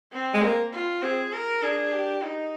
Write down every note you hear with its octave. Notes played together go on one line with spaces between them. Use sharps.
C4
G#3
A#3
F4
C4 G#4
A#4
D4 G#4
G4
D#4